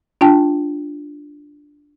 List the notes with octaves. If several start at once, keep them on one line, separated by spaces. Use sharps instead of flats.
D4 F4 G5 A5